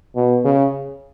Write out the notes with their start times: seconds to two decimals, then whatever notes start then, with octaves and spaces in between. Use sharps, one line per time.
0.16 B2
0.45 C#3